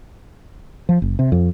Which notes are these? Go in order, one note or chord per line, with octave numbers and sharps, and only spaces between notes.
F3
F#1
C3
F2